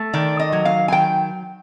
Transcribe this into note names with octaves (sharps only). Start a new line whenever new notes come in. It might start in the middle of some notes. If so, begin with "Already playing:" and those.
Already playing: A3
D#3 D5
D#5
F#3
F5
G#5
D#3 G5